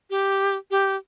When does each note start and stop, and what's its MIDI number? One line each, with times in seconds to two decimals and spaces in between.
0.10 0.56 67
0.71 0.96 67